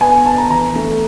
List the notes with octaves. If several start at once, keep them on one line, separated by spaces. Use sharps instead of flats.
B3 G#5
B3 A5
A#5
E3 A#5
A3